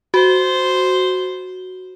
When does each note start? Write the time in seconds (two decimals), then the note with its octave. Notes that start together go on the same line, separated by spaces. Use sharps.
0.14 F#4 C5